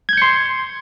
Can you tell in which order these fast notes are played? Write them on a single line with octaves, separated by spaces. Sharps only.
G#6 G6 C#7 C6